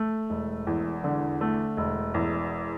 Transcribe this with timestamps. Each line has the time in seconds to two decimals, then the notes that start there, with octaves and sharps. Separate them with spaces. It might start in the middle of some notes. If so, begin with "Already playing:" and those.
Already playing: A3
0.30 E1
0.67 E2
1.04 D3
1.41 A3
1.77 E1
2.14 E2